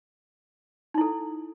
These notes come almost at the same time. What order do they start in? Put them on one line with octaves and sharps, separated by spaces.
D#4 E4 A4